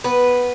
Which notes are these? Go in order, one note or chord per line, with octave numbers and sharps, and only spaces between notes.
B3 B4